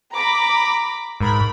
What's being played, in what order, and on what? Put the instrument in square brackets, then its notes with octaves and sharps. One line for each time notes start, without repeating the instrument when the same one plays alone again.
[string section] A#5 B5 D6
[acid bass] G#2 [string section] A#4 B5